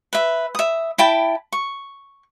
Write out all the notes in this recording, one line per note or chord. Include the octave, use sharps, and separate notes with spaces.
B4 E5
E5 D#6
E4 G5 A5 B5
C#6